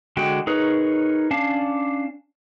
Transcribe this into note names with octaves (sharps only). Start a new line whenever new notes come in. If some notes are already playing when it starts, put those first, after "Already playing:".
D3 G#3 F#4 G5
D#4 G#4 A#4 B4 C#5
C#4 D4 F5 A5